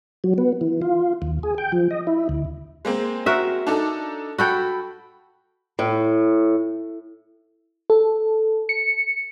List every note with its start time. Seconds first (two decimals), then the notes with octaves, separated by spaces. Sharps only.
0.24 F#3
0.38 B3
0.61 E3
0.82 F4
1.22 D#2
1.43 G#4
1.58 G5
1.72 F3
1.91 D#5
2.07 E4
2.29 D2
2.85 G#3 A#3 C4
3.26 F#4 A#4 E5
3.67 D4 D#4 A4
4.38 F#4 A4 G5 B5
5.79 A2
7.90 A4
8.69 C#7